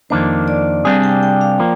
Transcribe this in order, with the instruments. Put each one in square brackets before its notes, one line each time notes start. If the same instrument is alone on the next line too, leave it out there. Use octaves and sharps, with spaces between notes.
[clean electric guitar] F2 D#3 A#3 D4 [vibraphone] C5
[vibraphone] D5
[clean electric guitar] C2 C3 G3 D4 G#4 [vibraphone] F5
[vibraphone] G5
G5
F5
[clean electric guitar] F3 A#3